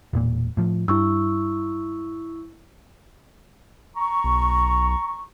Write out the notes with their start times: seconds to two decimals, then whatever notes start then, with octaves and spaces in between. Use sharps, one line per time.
0.13 E1 A#2
0.57 A2 F3
0.88 G2 E4 C#6 E6
3.96 A#5 C#6
4.24 B1